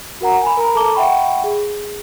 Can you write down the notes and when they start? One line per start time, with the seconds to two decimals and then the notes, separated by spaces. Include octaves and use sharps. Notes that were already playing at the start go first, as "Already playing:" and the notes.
0.21 F#4 A#4 F#5 A#5
0.42 G#5 B5
0.57 A#4 A#5
0.75 A4 A5 A#5 D6 G7
0.94 E5 F#5 G5 B5 C#6
1.44 G#4